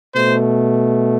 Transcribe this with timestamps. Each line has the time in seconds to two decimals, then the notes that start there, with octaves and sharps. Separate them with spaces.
0.12 B2 A3 C5